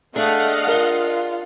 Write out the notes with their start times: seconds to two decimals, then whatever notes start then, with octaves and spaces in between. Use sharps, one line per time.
0.16 A3 D4 G#4 D#5 F5 F#5
0.67 F4 A#4 G7